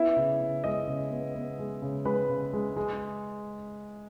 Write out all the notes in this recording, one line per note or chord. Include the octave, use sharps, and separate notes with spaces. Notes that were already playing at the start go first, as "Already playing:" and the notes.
Already playing: B3 E4 E5
C#3
C#3
G#3 D#5
C#3
B3
B3
G#3
C#3
G#3 B4 B5
C#3
G#3
G#3